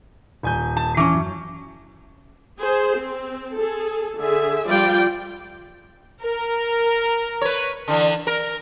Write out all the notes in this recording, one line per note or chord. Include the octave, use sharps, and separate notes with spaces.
D#1 G#5 G6
A5
E3 C#4
F#2
G#4 C5
C4
G#4 A4
D3 G#4 E5
F3 G3 F4 D5 G5
A#4
B4 C#5
D3 E3
A#4